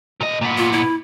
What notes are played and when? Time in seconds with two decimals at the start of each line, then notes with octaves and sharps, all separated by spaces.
0.21 A#2 D#5
0.41 A#2 B3
0.58 F4
0.72 E4